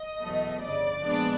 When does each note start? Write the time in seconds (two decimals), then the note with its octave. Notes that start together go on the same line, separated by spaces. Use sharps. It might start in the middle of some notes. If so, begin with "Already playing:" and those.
Already playing: D#5
0.20 E2 B2 F#3 A3
0.62 G1 F2 C#3 D5
1.04 A#2 F3 G#3 B3 D4